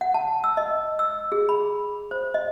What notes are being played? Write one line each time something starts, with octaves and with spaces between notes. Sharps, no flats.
F#5
A5
E6
D#5
E6
G#4
B5
C5
D#5